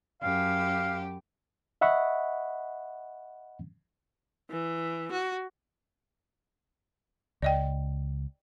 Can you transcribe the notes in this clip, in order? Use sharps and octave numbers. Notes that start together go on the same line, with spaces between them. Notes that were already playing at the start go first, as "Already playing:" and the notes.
F#2 G4 F5
D#5 E5 F#5 B5 C#6
E3
F#4
C#2 D5 D#5 G5